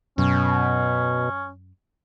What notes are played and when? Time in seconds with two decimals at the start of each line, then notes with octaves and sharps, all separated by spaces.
0.18 F#2 B2 C#4